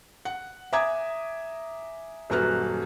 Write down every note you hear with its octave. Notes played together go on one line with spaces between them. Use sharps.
F#5
E5 G#5 A#5 D6 D#6 G#6
D#1 F#2 F#4 B4 F6